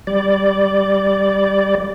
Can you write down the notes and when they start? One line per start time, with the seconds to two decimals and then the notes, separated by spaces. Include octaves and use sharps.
0.07 G3 D5